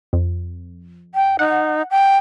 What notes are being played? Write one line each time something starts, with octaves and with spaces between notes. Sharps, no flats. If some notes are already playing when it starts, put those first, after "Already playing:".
F2
G5
D#4 F#5
G5